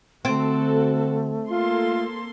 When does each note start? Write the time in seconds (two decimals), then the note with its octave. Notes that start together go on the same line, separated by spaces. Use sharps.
0.25 D3 A3 C4 F#4 A4
1.50 A#3 F4 A4 C6